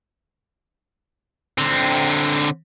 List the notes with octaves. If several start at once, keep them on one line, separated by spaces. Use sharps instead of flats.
D3 C4